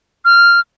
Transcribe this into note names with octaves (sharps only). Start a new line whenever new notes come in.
F6